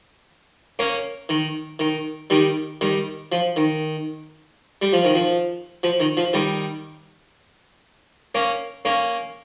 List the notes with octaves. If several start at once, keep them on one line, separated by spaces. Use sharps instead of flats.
A#3 C#4
D#3
D#3
D#3 G3
D#3 G3
F3
D#3
G3
F3
D#3
F3
F3
D#3
F3
D#3 G3
A#3 C#4
A#3 C#4